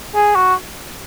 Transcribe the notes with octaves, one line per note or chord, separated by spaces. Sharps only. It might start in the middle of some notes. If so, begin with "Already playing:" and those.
G#4
F#4